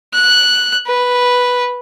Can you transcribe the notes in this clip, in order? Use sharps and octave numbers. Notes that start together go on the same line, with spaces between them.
F#6
B4